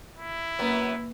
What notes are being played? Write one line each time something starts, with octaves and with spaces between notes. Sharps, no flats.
E4
F#2 A#3 B3 B4